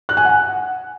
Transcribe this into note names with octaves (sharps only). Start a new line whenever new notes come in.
F#6
G#5
F#5